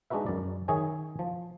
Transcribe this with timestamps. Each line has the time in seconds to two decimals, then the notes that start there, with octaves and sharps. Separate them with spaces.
0.10 G#3 D4 D#4 F#4 B4 E5
0.26 F#2 D5
0.68 D#3 G#4 C#5 E5 G#5
1.19 F3